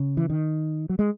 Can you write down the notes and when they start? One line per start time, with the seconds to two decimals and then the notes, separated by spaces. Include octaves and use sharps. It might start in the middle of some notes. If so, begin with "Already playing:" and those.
Already playing: C#3
0.17 E3
0.30 D#3
0.89 F#3
0.99 G#3